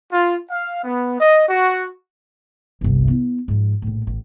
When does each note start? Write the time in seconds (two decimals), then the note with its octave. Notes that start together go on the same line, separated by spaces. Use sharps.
0.11 F4
0.50 F5
0.83 B3
1.20 D#5
1.49 F#4
2.81 G1 C2
3.08 B3 E4
3.48 G#2 F3
3.82 A#1 A2
4.07 A1